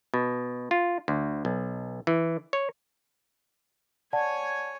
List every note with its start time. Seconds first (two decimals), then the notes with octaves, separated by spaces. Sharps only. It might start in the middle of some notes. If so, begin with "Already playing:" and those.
0.14 B2
0.71 F4
1.08 D2
1.45 B1
2.07 E3
2.53 C#5
4.13 C#5 D5 F#5 G#5 A5